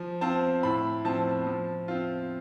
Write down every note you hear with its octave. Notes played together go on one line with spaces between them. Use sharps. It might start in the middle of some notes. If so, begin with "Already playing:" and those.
Already playing: F3
C4 F4 A5
A2 B5
F3 C4 A5
F3
C4 F4